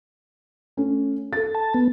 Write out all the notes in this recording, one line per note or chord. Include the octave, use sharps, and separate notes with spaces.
A3 C#4
A4 A6
A5
B3